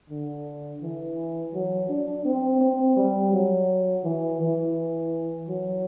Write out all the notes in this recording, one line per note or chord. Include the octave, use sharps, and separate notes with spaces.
D3
E3
F#3
D4
C4
C4
G3
F#3
E3
E3
F#3